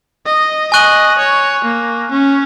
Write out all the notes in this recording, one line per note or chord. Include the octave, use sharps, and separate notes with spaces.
D#5
D#5 G#5 C#6 F#6 D#7 F#7
C#5
A#3
C#4